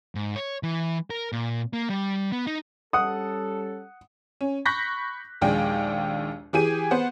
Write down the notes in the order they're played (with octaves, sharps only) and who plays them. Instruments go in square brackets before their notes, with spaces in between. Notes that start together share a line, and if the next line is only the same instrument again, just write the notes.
[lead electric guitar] G#2
C#5
E3
A#4
A#2
A#3
G3
B3
D#4
[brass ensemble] G3 C#4 A4 [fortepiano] F#5 D#6
[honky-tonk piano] C#4
B5 C#6 F#6 G6 A#6 B6
A#1 D#2 G#3 D5 G5
E3 G4 G#4 D#7
B3 C5 F#5